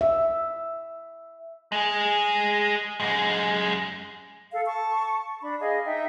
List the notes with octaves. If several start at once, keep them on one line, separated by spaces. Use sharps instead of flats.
E5
G#3 G#4
F#2 G#3
A4 F5
A5 C#6
D4 B5
G#4 D#5 F5
D#4 E5 G5